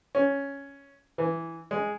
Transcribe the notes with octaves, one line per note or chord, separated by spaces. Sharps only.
C#4
E3
G#3